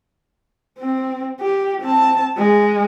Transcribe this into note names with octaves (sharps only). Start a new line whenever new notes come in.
C4
G4
C4 A5
G#3